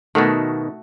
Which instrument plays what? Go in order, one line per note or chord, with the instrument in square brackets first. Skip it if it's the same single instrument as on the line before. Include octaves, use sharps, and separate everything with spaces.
[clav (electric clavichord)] B2 D#3 [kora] A3 F#4